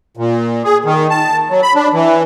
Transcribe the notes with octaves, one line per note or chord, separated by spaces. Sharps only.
A#2
G#4
D#3
A5
F#3
B5
D4
E3